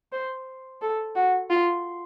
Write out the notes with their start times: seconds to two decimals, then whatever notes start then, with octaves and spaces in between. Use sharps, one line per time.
0.12 C5
0.82 A4
1.16 F#4
1.50 F4